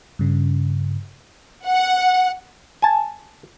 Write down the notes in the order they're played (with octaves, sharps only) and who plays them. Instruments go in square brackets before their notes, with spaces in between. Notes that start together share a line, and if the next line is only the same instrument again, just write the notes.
[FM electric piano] G2 C#3
[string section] F#5
[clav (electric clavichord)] G#5 A5